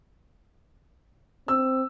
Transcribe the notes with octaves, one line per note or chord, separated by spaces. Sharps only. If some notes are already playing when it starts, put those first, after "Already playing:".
C4 E6